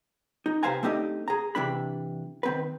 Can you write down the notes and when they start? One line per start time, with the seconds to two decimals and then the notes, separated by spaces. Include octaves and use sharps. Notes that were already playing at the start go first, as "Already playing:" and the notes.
0.46 D#4
0.63 C3 B4 C5 F5 G#5 A#5
0.83 A3 C4 D4 D#4 G4 D#5
1.28 G#4 A#5
1.55 C3 E3 D4 B5
2.43 D#3 C4 B4